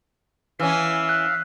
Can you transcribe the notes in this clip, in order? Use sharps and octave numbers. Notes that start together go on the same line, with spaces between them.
E3 C#4 E5 F5
F#6